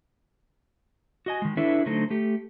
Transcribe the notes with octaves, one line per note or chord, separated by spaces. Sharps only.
F#4 D#5 G#5
D#3 G#3
D4 E4 A4 B4 C#5 E5
D3 F#3 A3 D#4 A4 C5
A3 G4 A4